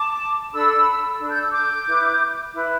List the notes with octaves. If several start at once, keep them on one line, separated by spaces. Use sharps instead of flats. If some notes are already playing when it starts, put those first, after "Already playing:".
Already playing: A5 D6
D4 A4 B5 E6
D4 A4
G6
E6
D6 G6
E4 B4
E4 B4